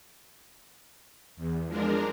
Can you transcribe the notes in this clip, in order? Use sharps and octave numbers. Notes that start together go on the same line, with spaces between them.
E2
F3 G#3 D4 A#4